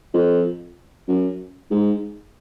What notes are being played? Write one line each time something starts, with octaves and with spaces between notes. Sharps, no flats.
F2
F#2
G#2